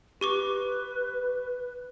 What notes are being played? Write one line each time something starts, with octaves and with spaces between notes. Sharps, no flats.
G4 B4 C#6 D6